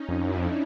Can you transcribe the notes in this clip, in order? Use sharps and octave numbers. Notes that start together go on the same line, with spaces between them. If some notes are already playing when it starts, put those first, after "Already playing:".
Already playing: C#4 D#4
F2
F#2 D4 E4
F2